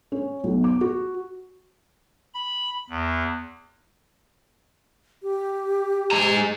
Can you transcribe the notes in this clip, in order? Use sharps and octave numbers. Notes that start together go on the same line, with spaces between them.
C#4
B1
D6
F#4
B5
E2
G4
G#3 A#5